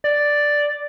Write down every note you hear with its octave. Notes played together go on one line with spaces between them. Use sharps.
D5